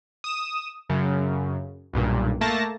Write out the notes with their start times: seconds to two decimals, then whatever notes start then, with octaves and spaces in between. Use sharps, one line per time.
0.24 D#6 E7
0.89 F#2 C#3
1.93 B1 G2 A#2
2.41 A3 A#3 A5 A#6